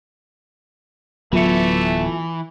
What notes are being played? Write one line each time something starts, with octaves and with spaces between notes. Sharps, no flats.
D1 E3 F#3 A3 B3 F4 E5 C#7